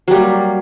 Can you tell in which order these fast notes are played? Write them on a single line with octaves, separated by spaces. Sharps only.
F#3 G3 A#3